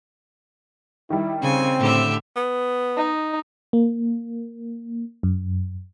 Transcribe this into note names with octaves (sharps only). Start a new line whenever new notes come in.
D#3 G3 E4
C#3 C4 G#5
A2 D3 G4 E5
B3
D#4
A#3
F#2